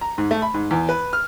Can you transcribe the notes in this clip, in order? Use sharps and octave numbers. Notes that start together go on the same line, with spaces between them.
A#5
G#2
A3
B5
G#2
E2
B4
F6